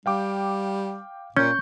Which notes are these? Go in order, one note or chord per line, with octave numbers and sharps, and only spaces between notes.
G3 F5 G5 D6
A#2 C#4 C#6 G6